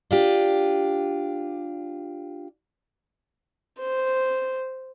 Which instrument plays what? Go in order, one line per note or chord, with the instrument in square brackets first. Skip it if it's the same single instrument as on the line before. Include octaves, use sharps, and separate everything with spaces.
[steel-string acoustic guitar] D4 F4 G4
[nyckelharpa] C5